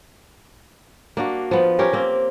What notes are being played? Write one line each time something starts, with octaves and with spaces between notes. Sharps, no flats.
A#3 D4 F#4
F3 B3
C#4 G4 A#4
A#3 C4